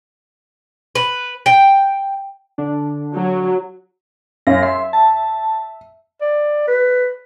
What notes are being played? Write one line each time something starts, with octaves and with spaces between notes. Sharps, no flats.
B4
G5
D3 D4
F#3
F#2 C#4 F5 A#6
E5 C6
A5
D5
B4